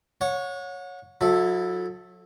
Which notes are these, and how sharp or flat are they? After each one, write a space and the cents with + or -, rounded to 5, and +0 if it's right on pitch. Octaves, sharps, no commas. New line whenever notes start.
C#5 +0 F#5 -35
F#3 -35 E4 +0 A4 +0